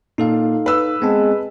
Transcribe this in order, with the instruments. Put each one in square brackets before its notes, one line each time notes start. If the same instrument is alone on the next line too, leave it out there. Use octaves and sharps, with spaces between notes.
[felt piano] A#2 [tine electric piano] D#4 A4 F5
[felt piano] B4 E6
[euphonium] G#3 [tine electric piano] B3 C4 A5